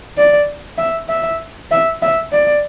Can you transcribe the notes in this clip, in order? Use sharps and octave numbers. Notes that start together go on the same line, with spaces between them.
D5
E5
E5
E5
E5
D5